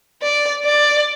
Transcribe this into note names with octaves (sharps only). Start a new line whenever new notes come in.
D5
D5